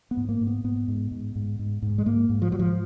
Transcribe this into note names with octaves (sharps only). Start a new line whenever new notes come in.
B3
G#2
A#3
G#2
B3
G#2 B3
G#2
G#2
G#2
G#2
G#2
G#3
G#2 A#3
G#2
F3
G#2 F#3
F3